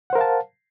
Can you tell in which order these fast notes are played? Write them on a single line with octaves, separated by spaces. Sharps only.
F#5 C5 A#4 F5 A5